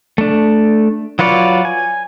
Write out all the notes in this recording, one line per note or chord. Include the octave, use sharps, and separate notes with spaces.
A3 D4
F#3 F4 B4 C#5 D5
G#5